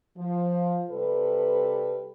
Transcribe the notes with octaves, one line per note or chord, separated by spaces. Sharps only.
F3
C3 G3 A4 B4